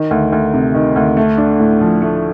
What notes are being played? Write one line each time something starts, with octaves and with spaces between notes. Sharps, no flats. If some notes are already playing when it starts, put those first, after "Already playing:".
Already playing: D#3
D2
D2
C3
D#3
D2
A3
D4
A2
F3
A3